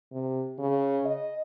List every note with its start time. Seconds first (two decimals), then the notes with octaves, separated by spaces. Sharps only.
0.12 C3
0.59 C#3
1.05 D#5